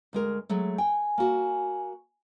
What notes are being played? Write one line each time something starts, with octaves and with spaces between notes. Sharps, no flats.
D2 G#3 A#4
F#3 G#3 A3
G5 G#5
A#3 F#4